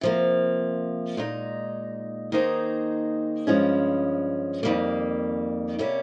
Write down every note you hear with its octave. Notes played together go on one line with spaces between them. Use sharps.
C3 F3 A#3
A#2 G#3 D#4
D#3 A#3 D#4 G#4 C5
G2 F3 G#3 C#4
F2 D#3 G3 A#3
C3 G3 A#3 C#4